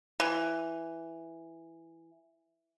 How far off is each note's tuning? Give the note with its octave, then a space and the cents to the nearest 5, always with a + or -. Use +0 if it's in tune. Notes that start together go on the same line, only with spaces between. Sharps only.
E3 +5